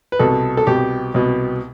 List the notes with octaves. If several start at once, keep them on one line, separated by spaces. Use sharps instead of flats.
B4
C2 B2 A4
A4
C2 B2 G4
C2 B2